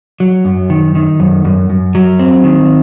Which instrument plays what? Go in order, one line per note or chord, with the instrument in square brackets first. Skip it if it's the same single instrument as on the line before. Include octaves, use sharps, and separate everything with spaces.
[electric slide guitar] F#3
F#2
D#3
D#3
F#2
F#2
F#2
F#3
C4
D#3